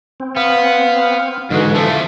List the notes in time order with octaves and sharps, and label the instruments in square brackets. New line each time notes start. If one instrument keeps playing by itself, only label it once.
[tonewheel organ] C4
[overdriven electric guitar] B3 [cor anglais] F5
[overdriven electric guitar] G#2 G#3 [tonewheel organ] D3 E3 [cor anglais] F#4
[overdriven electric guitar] F3 A3 [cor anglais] A4